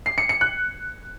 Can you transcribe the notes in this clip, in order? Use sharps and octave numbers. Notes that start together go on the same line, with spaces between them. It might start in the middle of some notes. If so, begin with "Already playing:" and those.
C7
C#7
C#7
F#6